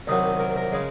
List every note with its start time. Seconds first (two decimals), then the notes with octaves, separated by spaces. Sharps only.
0.07 C2 C3 D#3 F#3 D#4
0.40 A#4
0.56 A#4
0.72 C#3 G#3